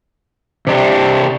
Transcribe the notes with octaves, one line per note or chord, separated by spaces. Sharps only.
C3 D4 G4